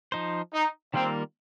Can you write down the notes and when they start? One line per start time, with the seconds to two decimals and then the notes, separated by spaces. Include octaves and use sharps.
0.12 F3 D#4 C5
0.53 D#4
0.94 D#3 G3 A#3 C4 F4 A#4